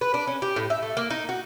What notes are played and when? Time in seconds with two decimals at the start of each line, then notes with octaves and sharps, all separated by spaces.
0.01 B4
0.14 D4
0.27 C#4
0.42 G4
0.56 A2
0.70 E5
0.83 A3
0.97 A#3
1.10 D#4
1.29 F#4